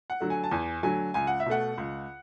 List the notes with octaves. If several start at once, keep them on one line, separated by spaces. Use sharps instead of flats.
F#5
D3 F#3 A3
G#5
A5
E2 G#5
D3 F#3 A3 G#5
C#2 G#5
F#5
E5
B2 A3 F#5
C#2